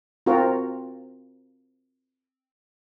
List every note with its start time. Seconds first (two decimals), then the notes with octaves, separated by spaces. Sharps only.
0.26 C4 F4 F#4 A#4